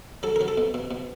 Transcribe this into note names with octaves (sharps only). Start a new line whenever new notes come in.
F#3 A4
F#3 A#4
A4
B2
B2
B2